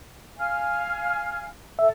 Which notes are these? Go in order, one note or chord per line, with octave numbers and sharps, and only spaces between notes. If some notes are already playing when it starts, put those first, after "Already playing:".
F5 G#5 F6
A4 E5